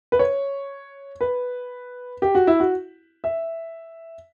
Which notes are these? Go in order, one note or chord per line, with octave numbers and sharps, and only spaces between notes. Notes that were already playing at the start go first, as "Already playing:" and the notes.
B4
C#5
B4
G4
F#4
E4
F#4
E5